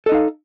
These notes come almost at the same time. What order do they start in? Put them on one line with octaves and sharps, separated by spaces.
A4 D#5 D#4 F5